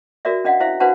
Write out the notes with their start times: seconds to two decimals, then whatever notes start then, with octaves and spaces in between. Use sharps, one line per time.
0.25 F#4 A#4 D5 E5
0.45 C#4 D4 D#5 F5 F#5
0.60 E4 C5 E5 F5
0.80 D4 F#4 B4 C5 F#5 A5